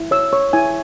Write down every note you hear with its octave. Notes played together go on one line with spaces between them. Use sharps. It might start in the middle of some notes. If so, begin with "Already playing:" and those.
Already playing: E4
C#5 E6
C#5 C#6
E4 G#5